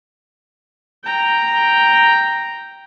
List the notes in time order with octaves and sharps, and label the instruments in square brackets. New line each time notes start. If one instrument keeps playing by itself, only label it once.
[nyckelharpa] G5 A#5